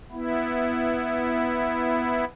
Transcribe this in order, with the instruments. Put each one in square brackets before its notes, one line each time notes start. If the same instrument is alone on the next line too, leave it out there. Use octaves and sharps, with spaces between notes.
[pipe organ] B3 E4